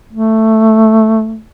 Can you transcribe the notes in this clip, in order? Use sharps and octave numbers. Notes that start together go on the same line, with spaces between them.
A3